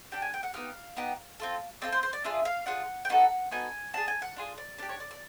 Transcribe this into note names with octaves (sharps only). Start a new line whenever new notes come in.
D4 G4 G5
G#5
G5
F#5
B3 D#4 G4 F5
B3 D#4 G4
C4 F4 A4
C4 F4 A4 D5
C5
C5
D5
D4 F4 G#4 E5
F5
D4 F4 G#4 F#5
G5
B3 D#4 F#4 A4 F#5
B3 D#4 F#4 A4 G#5
D4 F4 G#4 A5
G#5
F#5
D4 F4 G#4
D5
D4 G4 D5
C#5
D5
D5